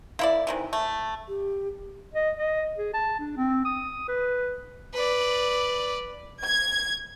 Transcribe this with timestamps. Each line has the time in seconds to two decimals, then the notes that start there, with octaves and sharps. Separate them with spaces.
0.19 A#3 E4 D5 E5
0.47 C3 D#3 E3
0.73 A3
1.27 G4
2.14 D#5
2.37 D#5
2.77 G#4
2.94 A5
3.19 D4
3.37 C4
3.65 D#6
4.08 B4
4.94 B4 D5
6.44 G#6